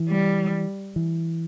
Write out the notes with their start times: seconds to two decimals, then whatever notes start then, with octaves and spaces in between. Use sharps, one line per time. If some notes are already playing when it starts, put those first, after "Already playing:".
Already playing: E3
0.08 G3
0.96 E3